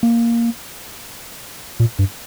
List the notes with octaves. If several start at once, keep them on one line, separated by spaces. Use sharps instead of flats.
A#3
A#2
G2